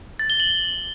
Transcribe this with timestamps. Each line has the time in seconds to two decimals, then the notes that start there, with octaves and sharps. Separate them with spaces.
0.19 A6
0.30 G7
0.40 F#7